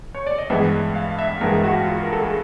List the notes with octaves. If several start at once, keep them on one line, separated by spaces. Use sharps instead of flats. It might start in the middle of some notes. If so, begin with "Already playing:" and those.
C#5
D5
D#5
G2 E3 G#3 B3 E5
F5
E5
G2 E3 G#3 B3 A#4
F#4
F4
A#4
A4
G#4